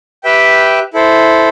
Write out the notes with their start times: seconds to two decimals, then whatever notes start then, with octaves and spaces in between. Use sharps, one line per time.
0.24 G4 B4 E5 G5
0.94 E4 A4 C5